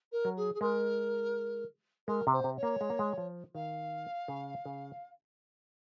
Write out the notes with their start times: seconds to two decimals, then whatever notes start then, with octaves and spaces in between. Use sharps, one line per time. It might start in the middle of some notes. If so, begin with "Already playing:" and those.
0.12 A#4
0.25 F#3
0.36 G#4
0.54 G#4
0.61 G#3 A#4
2.08 G#3 A#4
2.27 C3
2.32 C5
2.44 C3
2.57 C#5
2.63 A#3
2.81 G#3
2.90 A#3
2.99 G#3
3.18 F3
3.55 D#3 F5
4.28 C#3
4.66 C#3